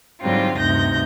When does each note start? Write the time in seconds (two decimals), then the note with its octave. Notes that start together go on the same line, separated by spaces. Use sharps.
0.20 G#2 D3 F#3 G3 C4 F4
0.58 D2 G2 C3 D#4 G6 A#6